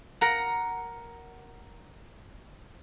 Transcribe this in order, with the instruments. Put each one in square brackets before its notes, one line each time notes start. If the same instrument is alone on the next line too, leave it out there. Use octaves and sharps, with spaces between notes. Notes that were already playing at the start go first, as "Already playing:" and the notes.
[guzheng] A#4 F#5 A#5